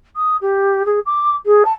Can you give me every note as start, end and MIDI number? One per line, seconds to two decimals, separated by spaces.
0.16 0.36 87
0.41 0.85 67
0.85 0.99 68
1.06 1.34 86
1.46 1.63 68
1.65 1.72 81